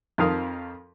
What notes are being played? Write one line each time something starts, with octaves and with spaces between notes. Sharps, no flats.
F2 D#3 F3 A#4 F5 D#6